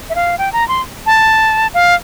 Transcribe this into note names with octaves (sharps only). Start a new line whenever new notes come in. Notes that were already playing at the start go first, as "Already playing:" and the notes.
E5
F5
G5
A#5
C6
A5
F5